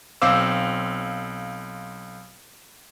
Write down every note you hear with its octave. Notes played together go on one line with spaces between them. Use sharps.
B1 C4 C5 F5 D6 E6